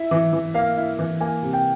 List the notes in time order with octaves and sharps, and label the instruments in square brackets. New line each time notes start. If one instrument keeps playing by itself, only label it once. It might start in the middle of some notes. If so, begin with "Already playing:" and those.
Already playing: [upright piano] E4 [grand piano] E5
[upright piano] E3
E3
[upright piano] A#3 [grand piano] F5
[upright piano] E4
E3
[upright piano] A#3 [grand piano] G#5
[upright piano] C3
[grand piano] G5